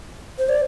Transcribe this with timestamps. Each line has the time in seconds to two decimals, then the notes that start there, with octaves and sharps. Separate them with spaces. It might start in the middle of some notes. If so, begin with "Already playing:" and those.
0.39 C5
0.49 D5